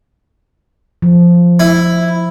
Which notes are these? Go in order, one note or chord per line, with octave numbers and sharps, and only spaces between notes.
F3
E4